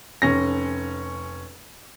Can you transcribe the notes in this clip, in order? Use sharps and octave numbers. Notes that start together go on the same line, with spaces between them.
F1 C#4 A#6